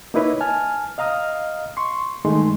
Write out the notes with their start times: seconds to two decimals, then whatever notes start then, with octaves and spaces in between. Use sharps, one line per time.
0.14 A#3 D#4 E4 B4 C#5 D#5
0.41 G#5 A5 F6
0.98 D#5 F5 A#5 D#6 F6
1.77 C6 C#6
2.25 G2 D#3 G#3 A3 D#4 C6